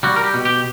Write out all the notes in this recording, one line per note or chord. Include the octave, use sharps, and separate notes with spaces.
G3 F#4
A#4
G4
B2
G4